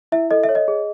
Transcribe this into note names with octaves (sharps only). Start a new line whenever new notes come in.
E4 E5
A4 D#5
E5
C#5
D#5
G#4